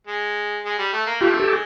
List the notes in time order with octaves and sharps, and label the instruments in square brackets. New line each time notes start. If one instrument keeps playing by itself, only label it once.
[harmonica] G#3
G#3
G3
A3
A#3
[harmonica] A3 [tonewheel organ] F4 G4
[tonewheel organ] G4 A4
[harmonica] G#3